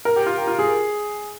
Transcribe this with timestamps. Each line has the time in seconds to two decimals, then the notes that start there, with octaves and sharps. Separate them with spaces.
0.05 A#4
0.16 G4
0.26 F4
0.37 G4
0.47 F4
0.59 G#4